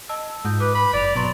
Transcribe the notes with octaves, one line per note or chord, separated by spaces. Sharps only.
D#5 A5 E6
G#2 F4 D#6 G6
B4 D6
B5
F#1 D5 D6 F7
B2 F#3 C6 C#6 A6